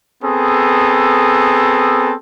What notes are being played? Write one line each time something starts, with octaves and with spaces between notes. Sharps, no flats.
B3 C4 G#4 A4